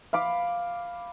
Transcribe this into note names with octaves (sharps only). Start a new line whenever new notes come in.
F5 B5 D6